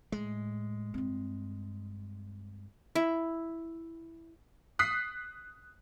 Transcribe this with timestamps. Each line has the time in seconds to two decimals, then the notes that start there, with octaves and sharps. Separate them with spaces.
0.12 A2 G#3
0.94 G2 C4
2.95 E4
4.79 D#6 F#6 B6 C7